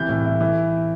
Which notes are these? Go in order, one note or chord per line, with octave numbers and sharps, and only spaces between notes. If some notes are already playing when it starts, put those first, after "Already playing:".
Already playing: C2 E3 G6
A2
E4
E3